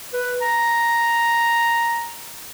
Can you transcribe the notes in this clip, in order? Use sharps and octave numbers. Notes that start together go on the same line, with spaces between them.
B4
A#5